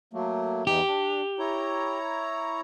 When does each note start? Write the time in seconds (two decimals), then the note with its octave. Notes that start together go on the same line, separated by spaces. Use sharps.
0.13 F#3 A3 A#3
0.67 E2 E3 D#4 G4
0.88 D4
1.39 E4 C#5 A#5